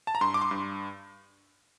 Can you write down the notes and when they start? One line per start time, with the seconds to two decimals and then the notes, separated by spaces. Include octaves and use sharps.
0.07 A5
0.15 A#5
0.21 G2 C6
0.34 D6
0.41 C6
0.51 G2